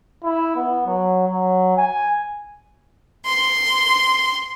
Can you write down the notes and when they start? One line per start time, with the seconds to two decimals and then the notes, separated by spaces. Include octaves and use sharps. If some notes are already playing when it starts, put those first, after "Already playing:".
0.23 E4
0.56 B3
0.86 F#3
1.27 F#3
1.77 G#5
3.26 C6